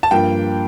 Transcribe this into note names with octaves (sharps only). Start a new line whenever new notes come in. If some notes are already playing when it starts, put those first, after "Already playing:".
A5
G2 F3 A#3 G5